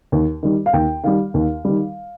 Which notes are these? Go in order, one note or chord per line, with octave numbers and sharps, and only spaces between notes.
D#2
D#3 G3
F5
D#2 G5
D#3 G3 F5
D#2
D#3 G3